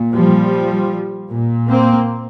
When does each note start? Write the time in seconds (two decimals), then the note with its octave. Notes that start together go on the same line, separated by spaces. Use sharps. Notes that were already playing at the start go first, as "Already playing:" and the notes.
Already playing: A#2
0.12 F3 G3
1.29 A#2
1.68 A#3 C4